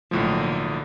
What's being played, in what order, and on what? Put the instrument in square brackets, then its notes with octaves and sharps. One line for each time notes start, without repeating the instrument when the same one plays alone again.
[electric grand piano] B1 A2 F3 [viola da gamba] D3 A#3